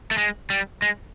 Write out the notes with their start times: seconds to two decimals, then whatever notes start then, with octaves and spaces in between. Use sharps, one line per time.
0.11 A3
0.18 G#3
0.50 G3
0.82 G#3